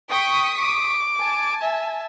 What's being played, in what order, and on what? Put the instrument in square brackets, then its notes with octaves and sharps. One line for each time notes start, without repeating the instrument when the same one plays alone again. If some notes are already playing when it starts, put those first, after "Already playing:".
[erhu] G5 [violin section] C#6 D#6 B6
[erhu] D6
[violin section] G#5 A5
[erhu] E5